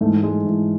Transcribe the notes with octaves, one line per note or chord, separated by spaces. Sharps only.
G#2 E3 A3
G#3
G#2 E3